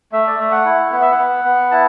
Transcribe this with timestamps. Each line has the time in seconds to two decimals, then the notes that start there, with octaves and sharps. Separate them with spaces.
0.12 A3 E5
0.27 D5
0.39 A3 E5
0.52 F#5
0.65 E4
0.92 B3 F#5
1.02 E5
1.11 F#5
1.18 B3
1.44 B3
1.71 E4 A5